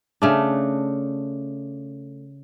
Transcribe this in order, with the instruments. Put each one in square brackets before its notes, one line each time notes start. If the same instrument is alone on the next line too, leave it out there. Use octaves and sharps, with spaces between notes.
[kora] C#3 A3 D4